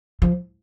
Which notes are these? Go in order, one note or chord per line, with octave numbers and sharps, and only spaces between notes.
F3